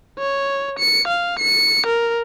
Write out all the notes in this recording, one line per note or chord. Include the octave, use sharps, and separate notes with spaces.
C#5
C#7
F5
C#7
A#4